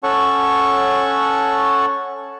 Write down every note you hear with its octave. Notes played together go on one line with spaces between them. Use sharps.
C#4 A4 C#5 F#5 A5 C#6